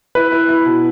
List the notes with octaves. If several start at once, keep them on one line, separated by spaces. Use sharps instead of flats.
E4 B4
E4
E4
B2